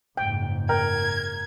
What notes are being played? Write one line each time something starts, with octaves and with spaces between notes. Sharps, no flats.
F#1 G#2 G5
A#4 G5 G#6